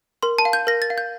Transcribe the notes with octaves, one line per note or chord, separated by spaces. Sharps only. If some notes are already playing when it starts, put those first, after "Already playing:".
A#4 C6
A5
F5
G6
A#4 A#6
A6
F5
G6